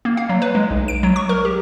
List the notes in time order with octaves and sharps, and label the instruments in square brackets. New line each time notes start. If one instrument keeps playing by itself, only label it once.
[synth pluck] A#3
F5
F#3
B4
G#3
B1
D7
F#3
C#6
A#4
G4